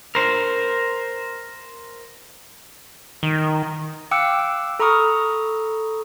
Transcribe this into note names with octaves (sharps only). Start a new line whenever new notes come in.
A#4 C5
D#3
F5 G5 D6 E6 F#6 C#7
A4 A#5 B5 C#6 D#6 F6